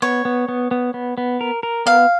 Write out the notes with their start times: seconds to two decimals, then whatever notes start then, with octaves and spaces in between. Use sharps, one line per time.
0.02 B3 C#5
0.25 B3
0.48 B3
0.71 B3
0.94 B3
1.18 B3
1.41 A#4
1.63 A#4
1.86 B3 F5